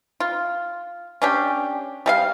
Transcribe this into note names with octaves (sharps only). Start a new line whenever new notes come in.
F4
C#4 D4 G4
G3 A4 F5